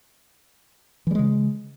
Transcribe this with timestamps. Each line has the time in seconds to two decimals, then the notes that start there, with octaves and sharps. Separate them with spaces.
1.07 E3
1.11 G3
1.15 G#3
1.19 C#3